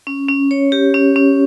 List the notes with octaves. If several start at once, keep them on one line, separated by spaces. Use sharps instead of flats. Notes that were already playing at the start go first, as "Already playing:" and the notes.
C#4
C#4
C#5
G4
C#4
C#4